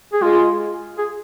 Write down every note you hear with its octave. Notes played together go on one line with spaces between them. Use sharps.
G#4
G#3 F4
G#4